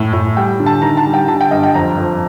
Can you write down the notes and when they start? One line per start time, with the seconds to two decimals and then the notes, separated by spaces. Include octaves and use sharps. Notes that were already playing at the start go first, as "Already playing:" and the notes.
Already playing: A2
0.13 A2
0.37 G3 G5
0.60 D3
0.66 A5
0.82 D#3 A#5
0.97 A5
1.05 G3
1.14 G5
1.28 D3 A5
1.41 G5
1.51 G2 D#5
1.63 G5
1.74 F2 A#5
1.98 F2